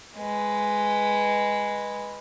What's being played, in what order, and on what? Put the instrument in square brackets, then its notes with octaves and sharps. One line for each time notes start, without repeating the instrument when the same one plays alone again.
[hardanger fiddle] G#3 B4